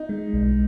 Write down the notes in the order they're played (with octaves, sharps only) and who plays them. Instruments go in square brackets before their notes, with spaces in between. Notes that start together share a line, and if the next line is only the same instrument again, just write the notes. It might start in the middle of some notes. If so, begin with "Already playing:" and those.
Already playing: [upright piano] D#4
[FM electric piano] G#3
B1